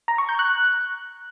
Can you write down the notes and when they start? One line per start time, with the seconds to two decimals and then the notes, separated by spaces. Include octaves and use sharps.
0.08 A#5
0.18 C#6
0.29 G6
0.39 F#6